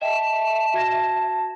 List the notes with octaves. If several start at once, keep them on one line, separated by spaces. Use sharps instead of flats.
D#5 E5 G5 A5 E7
F#4 G#6 A#6